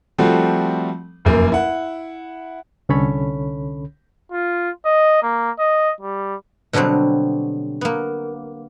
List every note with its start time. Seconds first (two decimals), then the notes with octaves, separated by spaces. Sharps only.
0.18 F3 G3 A3 C4 F#4
1.25 F1 F#2 A#3
1.52 E4 F#5
2.89 C2 D3 C#4 A4 C#5 B5
4.32 F4
4.85 D#5
5.23 A#3
5.59 D#5
6.00 G3
6.73 B2 D3 F#3 G3 C4
7.81 A#3 B3